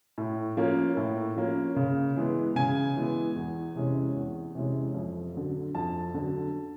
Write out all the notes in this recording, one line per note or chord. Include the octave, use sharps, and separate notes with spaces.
A2
F3 A#3 C#4
A2
F3 A#3 C#4
C#3
E3 G#3 B3
C#3 G#5
E3 G#3 B3
E2
C3 E3 G#3 C#4
E2
C3 E3 G#3 C#4
F2
D3 F#3
F2 A5
D3 F#3